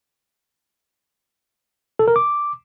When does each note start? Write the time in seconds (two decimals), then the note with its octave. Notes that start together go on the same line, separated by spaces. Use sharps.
1.99 A4
2.08 A#4
2.16 D6